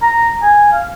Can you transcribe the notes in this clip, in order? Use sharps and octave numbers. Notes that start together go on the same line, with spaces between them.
A#5
G#5
F5